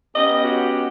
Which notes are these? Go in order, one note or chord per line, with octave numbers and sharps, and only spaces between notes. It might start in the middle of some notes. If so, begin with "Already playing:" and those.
B3 C#4 G4 D#5
F#4